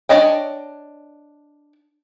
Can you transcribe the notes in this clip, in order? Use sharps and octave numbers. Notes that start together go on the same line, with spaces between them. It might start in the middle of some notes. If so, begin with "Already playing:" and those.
D4 C#5 D#5 G5